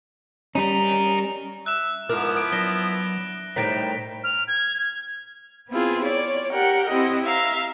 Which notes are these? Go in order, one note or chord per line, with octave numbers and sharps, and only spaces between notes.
G3 C#4 D#4 A#4
E5 F#6 E7
G#2 F3 B3 E4 A#4 D6 D#6
D7
F#3 D4 A#6 G7
A2 D#3 G3 C5 G5 A#5 B6 D7
F6
G#6
G#6
B3 C4 E4 F4 G#4
C#5 D5
G4 A#4 F#5 G5
C4 E4 G4 D#5
E5 F5 A#5